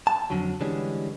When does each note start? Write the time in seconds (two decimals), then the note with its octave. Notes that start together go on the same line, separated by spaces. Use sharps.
0.07 A5
0.30 F2 D3 F#3
0.61 D3 E3 G3 G#3 C#4